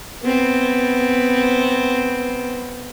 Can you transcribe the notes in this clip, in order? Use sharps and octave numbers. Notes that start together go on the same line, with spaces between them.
B3 C4